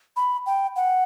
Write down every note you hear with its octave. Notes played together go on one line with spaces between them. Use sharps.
B5
G5
F#5